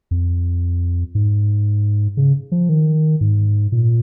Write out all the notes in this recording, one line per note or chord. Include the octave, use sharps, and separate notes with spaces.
F2
G#2
C#3
F3
D#3
G#2
A#2